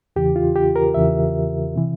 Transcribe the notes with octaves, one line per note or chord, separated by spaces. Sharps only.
E2 C#3 E3 G4
F4
G4
A#4
E2 C#3 E3 E5
C3 E3